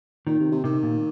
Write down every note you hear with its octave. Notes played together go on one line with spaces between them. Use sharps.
A#2 D#3
C3
C3
C3 D#3
A#2